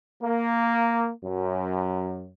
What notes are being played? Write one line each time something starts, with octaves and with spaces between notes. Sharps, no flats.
A#3
F#2